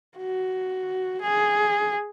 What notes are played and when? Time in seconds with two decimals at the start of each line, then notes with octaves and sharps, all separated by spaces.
0.17 F#4
1.21 G#4